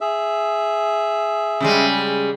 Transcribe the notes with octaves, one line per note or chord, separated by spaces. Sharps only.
G#4 E5
C#3 G3 G#3